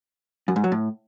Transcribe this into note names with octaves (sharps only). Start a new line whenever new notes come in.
F#2
G#2
F#3
A2